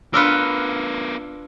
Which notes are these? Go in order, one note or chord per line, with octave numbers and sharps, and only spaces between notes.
B3 D4 F4 A#4 B4 E6 F6 C#7